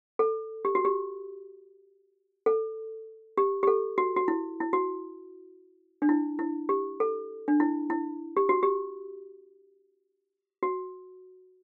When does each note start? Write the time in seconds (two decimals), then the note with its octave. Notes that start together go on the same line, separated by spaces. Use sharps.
0.19 A4
0.65 G4
0.75 F#4
0.85 G4
2.46 A4
3.38 G4
3.63 G4
3.67 A4
3.98 F#4
4.16 F#4
4.28 E4
4.61 E4
4.73 F#4
6.02 D4
6.09 E4
6.39 E4
6.69 G4
7.00 A4
7.48 D4
7.60 E4
7.90 E4
8.37 G4
8.49 F#4
8.63 G4
10.63 F#4